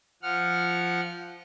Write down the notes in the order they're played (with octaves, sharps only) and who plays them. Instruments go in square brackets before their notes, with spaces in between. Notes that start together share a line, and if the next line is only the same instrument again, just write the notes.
[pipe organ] F3 F#5 F6